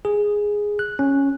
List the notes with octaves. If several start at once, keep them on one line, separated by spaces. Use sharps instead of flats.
G#4
F#6
C#4